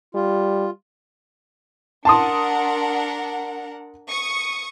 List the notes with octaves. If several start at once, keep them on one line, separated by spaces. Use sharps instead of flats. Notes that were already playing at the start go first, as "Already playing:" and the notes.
G3 F4
D4 A#4 F#5 A5 C6 D#6
C#6 D#6 C#7